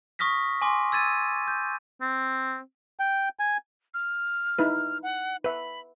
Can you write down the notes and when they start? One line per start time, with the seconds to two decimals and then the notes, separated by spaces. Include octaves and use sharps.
0.19 C#6 D#6 F6 A#6 B6
0.62 G#5 C6 D6
0.92 E6 G#6 A6 D#7
1.48 G6
2.01 C4
2.99 G5
3.39 G#5
3.94 F6
4.59 D#4 E4 B4
5.03 F#5
5.44 B4 E5 B5